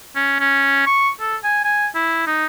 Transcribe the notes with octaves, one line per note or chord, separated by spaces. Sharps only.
C#4
C#4
C#6
A4
G#5
G#5
E4
D#4